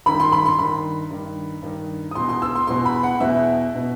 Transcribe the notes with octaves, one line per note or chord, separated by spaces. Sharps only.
G2 D#3 B5
C6
B5
C6
G2 D#3 B5
G2 D#3
G2 D#3
D#6
E2 B2 C6
C6
E6
C6
E2 B2 C6
B5
F#5
E2 B2 E5
B2